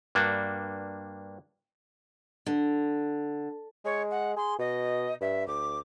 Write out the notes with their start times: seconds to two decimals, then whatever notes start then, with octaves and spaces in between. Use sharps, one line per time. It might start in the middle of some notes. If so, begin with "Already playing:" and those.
0.15 G2 A#3 D4 F#4
2.46 D3
3.85 G#3 C#5
4.10 F#5
4.36 G#4 C6
4.59 B2 D#5
5.21 G2 E5
5.47 D2 D6